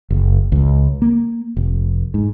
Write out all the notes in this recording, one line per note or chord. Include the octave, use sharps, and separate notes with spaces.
F#1
C#2
A#3
F1
G#2